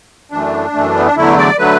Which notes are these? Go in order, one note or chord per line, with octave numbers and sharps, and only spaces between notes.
F#2 E3 A3 D4
F#2 E3 A3
B3
D4
E2 D3 F#3 A3 E4
D5
D3 F#3 A3 B4